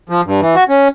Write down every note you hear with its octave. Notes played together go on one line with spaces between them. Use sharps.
F3
G2
E3
F#4
C#4